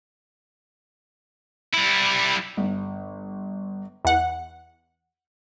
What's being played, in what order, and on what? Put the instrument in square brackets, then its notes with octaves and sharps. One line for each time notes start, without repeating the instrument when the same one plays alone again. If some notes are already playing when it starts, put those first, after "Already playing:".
[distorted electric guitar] G3 E4
[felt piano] G1
[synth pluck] E2 F#5